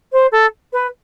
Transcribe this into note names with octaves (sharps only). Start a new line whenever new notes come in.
C5
A4
B4